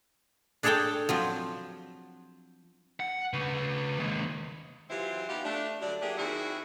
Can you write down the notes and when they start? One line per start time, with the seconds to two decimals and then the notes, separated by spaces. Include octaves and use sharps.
0.63 D4 G#4 A4 C#5 D5 G5
1.09 F3 F#3 C4
3.00 F#5
3.33 C#3 B4
3.99 D#2 G#3
4.90 E3 F#3 C4 E4 F4 G4
5.29 B3 D#4 F4 G4
5.44 A3 D4
5.81 D3 F#3 G3 D5
6.02 F#3 A#3 D4 E4 G4 G#4
6.17 D#3 C4 E4 F#4 G#4